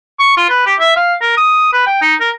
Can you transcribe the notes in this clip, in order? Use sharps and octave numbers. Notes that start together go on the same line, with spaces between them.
C#6
F4
B4
G4
E5
F5
A#4
D#6
B4
G5
D#4
A#4